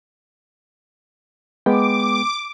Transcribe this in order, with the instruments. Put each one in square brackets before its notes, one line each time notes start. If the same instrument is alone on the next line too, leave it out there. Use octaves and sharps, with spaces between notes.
[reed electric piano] G#3 B3 G5 [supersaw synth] D6